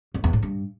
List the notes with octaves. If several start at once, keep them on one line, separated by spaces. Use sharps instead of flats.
F2
E2
A2
G2